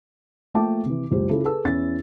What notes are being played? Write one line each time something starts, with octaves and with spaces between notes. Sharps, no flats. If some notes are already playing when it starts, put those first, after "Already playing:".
F3 A3 A#3 G5 A5 D6
C3 E3
F#1 C#2 G4 C5
C#3 E4 F4 A4
G#4 A4 B4 A5 E6
E2 C#4 E4 A6